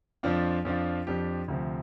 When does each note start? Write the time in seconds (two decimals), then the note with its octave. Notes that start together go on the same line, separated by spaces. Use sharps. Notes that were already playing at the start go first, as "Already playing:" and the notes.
0.23 F2 F3 D4 F4
0.65 F2 F3 D4 F4
1.07 F2 F3 D4 G4
1.48 D2 C3 F3